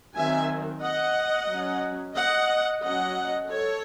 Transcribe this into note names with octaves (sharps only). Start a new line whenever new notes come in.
D#3 F#3 C4 E5 G#5
D#5 F#5
F#3 C#4
D#5 F#5
F#3 C#4 D#5 F#5
A4 C#5